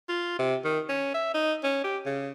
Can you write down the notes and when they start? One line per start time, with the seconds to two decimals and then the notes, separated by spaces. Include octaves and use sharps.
0.09 F4
0.39 C3
0.65 D#3
0.89 C#4
1.14 E5
1.34 D#4
1.64 C#4
1.84 G4
2.06 C#3